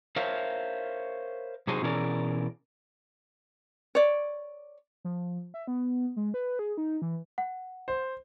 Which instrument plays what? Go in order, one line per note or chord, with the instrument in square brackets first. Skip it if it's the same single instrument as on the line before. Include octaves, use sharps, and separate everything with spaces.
[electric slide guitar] A#4 C5 C#5 E5 F5
C3 F#3 D#4 F#4 G#4 C5
B2 E3 C#4 G#4 A#4 D5
[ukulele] C#5 D5
[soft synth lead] F3
E5
B3
G#3
B4
G#4
D#4
E3
[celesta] F#5
[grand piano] C5